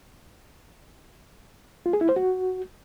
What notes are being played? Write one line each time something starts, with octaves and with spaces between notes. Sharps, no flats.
F4
G#4
E4
C5
F#4